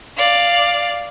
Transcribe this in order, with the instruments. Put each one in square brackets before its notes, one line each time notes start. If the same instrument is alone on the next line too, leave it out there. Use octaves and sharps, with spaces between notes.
[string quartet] D5 F5